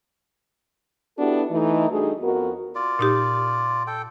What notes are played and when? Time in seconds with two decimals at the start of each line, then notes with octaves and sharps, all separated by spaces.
1.19 B3 D4 E4 F#4 G4 A4
1.50 E3 A3 D#4
1.91 G3 A3 D4 D#4 F#4 G#4
2.21 F2 B3 F#4 A#4
2.75 F4 D5
2.99 A#2 D#4 G4
3.87 A4 G5